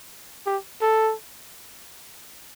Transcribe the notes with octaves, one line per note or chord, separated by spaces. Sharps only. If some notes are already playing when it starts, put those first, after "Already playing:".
G4
A4